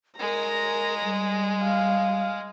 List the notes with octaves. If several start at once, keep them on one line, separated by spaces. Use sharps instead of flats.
G#3 A#4 A#5
G3
F5